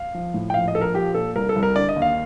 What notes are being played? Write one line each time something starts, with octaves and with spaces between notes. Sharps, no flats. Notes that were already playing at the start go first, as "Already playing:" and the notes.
Already playing: F5
F3
A2
G5
A#1 F5
D#5
A#1 A4
A#4
F3 G4
A#2 A4
C2 A#4
A4
C2
A#4
D3 D5
D#5
D#2
F5